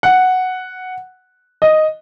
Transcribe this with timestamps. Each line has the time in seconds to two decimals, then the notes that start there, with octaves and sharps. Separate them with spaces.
0.03 F#5
1.62 D#5